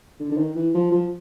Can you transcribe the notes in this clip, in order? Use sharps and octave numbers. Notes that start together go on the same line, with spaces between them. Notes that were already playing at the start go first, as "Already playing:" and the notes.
D3
D3
D#3
E3
F3
F3